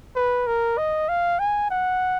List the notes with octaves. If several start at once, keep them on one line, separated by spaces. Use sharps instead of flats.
B4
A#4
D#5
F5
G#5
F#5